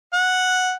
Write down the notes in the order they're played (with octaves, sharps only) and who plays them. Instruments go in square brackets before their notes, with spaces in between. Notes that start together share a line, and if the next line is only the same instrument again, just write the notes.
[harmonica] F#5